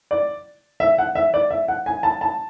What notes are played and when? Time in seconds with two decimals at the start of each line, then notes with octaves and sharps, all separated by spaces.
0.11 D5
0.80 E5
0.98 F#5
1.15 E5
1.34 D5
1.50 E5
1.68 F#5
1.86 G#5
2.03 A5
2.21 A5